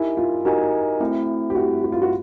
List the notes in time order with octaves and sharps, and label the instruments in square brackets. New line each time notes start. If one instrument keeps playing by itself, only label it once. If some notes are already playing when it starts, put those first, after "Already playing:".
Already playing: [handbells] D#4 G4 A#4 D#5 G#5 [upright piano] E4
[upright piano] F4
[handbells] D#4 G4 A#4 D#5 G#5 [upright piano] F#4
[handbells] A3 C4 E4
[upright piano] G4
[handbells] A3 C4 E4 [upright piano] F#4
[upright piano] F#4
F4
F#4